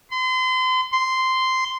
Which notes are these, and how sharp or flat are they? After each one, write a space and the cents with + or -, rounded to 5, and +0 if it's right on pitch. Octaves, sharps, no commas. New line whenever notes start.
C6 -35
C6 -10